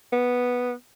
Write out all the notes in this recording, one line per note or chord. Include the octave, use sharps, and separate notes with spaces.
B3